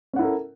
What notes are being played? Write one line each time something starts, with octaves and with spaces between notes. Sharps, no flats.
C#4 E4 A4 A#4 F#5